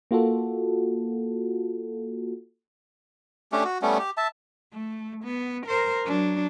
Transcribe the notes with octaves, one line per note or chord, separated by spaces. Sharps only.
A#3 F4 F#4 A4
A3 C#4 D4 G4
F#4
G3 A3 B3 C#4
G4
E5 A5
A3
B3
A#4 C5
F#3 D4